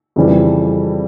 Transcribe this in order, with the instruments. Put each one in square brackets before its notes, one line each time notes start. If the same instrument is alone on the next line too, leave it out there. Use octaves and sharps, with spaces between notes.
[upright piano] F2 C#3 E3 G3